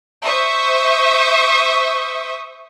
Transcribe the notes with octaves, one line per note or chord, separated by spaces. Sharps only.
C5 E5 C#6 D#6